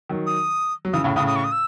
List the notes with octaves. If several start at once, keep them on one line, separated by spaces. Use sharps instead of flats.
D#3 F#3
D#6
F#3
C#3 E3 D#6
A2 C#3
A2 C#3 D#6
D#6
C#6
D#6
E6